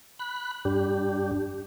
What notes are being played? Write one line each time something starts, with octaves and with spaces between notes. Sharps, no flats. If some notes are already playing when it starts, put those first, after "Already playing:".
B5 F#6
G2 D4 G4